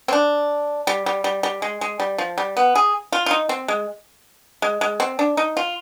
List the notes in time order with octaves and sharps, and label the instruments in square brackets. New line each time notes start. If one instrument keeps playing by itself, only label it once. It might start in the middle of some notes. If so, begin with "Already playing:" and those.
[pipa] C4
D4
G3
G3
G3
G3
G#3
G#3
G3
F3
G3
B3
G#4
F4
F4
D#4
C4
G#3
G#3
G#3
C4
D4
D#4
F4